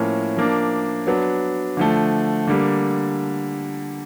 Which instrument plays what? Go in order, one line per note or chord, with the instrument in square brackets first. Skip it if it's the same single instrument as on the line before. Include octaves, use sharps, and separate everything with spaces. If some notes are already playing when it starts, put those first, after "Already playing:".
Already playing: [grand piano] A2 F3 A#3 C#4
F3 A#3 D4
F#3 B3 D4
D3 F3 A3
D3 G3 A#3